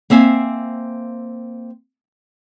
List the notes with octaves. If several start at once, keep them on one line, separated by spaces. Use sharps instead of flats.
A#3 C4 E5 F5 G#5